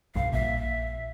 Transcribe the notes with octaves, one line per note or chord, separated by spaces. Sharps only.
B1 G2 F5
A#1 A#2 E5